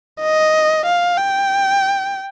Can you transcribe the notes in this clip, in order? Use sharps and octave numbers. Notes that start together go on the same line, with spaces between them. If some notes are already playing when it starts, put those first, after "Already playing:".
D#5
F5
G5